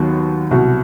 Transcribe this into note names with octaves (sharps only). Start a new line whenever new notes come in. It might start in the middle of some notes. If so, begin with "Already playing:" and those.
Already playing: D#2 D#3 F#3 B3 F#4
C2 B2 F#3 F#4